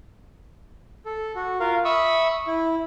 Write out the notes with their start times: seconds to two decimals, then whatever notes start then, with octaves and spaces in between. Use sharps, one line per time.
1.06 A4
1.36 F#4
1.60 F4 A#4 F5
1.85 E5 B5 C#6 D#6 E6
2.47 E4